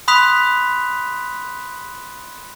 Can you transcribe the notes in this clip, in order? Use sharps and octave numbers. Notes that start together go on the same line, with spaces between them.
B5 C6 D#6 F#6 B6 F7